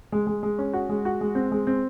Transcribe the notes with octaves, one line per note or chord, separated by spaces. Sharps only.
G#3
G#3
G#3
C#4
F#4
G#3
F#4
G#3
C4
G#3
C4